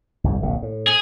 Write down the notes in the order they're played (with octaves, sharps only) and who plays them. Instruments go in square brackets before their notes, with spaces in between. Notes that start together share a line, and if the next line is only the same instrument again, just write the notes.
[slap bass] G1 C2 F2
D1 A#1 C3
A2
[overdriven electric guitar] G#4